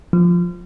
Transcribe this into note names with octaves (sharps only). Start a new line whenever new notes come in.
F3